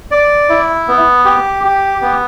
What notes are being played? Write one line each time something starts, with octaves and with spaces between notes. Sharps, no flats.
D5
E4
B3
G4
G4
B3